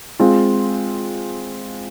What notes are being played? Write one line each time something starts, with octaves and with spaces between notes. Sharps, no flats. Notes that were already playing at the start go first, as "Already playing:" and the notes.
G#3 C4 F4